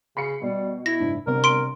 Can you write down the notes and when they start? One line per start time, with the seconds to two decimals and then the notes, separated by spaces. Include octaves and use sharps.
0.17 C#3 B5 C7 C#7
0.42 B2 G3
0.86 E4 A#6
1.00 F#1 G#2 D4
1.27 G1 C3 A#4
1.44 C6 D7